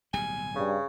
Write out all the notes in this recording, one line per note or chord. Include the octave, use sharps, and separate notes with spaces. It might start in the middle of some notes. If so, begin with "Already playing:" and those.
D1 B1 G3 G#5
G2 C#3